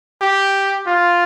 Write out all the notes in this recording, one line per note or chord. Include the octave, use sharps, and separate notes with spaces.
G4
F4